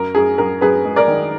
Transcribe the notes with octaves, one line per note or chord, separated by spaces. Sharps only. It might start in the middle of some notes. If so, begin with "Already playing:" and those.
Already playing: F#2 A#4
F#2 G#4
F#2 A#4
F#2 G#4 B4
G#3
A#4 D5
D#3